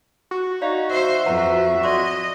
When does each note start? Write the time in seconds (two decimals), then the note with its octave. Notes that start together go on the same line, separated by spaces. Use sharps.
0.31 F#4
0.62 D#4 D5 F5
0.90 C5 E5
1.26 F2 B4 F#5 A#5
1.83 D5 D#5 C6 D6